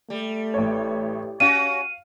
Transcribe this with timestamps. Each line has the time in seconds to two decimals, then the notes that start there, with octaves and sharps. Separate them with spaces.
0.10 G3 A3
0.54 A1 C#5
1.40 C#4 F#4 F5 D#7